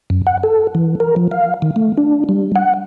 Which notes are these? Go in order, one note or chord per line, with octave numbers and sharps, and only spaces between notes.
F#2
F#5
A4
E3
A#4
F3
F5
D#3
A3
D4
G3
F#5